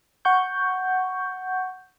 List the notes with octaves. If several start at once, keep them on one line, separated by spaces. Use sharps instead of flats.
F#5 C#6 G6